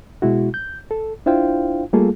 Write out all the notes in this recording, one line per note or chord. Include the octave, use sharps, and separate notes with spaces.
B2 G#3 E4 F#4
G6
A4
D4 E4 F4 C5 F5 G5
G3 A3 A#3 F4 G#4 A4